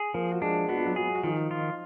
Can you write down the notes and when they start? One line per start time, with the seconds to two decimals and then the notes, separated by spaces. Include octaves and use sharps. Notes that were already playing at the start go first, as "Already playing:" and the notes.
Already playing: G#4
0.14 F3 A#3 A#4
0.31 F#4
0.42 G#3 D4 G#4
0.69 B3 F#4
0.77 F4
0.86 F#3 F#4
0.96 F#3 F#4 G#4
1.15 F#4
1.23 D#3 F3 F4
1.51 F4
1.59 D#4